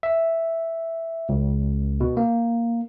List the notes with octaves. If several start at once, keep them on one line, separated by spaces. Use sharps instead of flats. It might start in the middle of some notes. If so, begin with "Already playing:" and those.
E5
C#2
B2
A#3